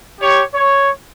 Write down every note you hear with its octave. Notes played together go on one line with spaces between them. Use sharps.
G4 C#5
C#5